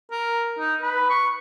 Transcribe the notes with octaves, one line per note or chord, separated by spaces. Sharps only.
A#4
D#4
B4
C#6